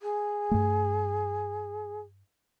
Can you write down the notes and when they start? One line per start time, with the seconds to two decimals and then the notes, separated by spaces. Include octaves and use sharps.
0.02 G#4
0.51 G2 A3